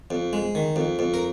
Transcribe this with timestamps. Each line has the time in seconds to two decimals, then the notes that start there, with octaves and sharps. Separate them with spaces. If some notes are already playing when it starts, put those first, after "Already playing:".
0.11 F2
0.33 G#3
0.55 D#3
0.76 F2
0.99 F2
1.14 A#4